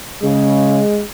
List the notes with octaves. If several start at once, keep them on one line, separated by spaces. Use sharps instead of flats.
C#3 G#3